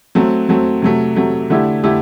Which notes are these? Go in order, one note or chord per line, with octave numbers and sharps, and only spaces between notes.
F#3 A3 C4
F#3 A3 C4
C3 F#3 A3
C3 F#3 A3
D3 A3 E4 G4
D3 A3 E4 G4